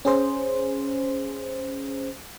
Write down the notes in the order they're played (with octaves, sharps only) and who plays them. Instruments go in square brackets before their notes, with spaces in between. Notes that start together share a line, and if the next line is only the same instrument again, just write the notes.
[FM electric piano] C#4 G#4 C5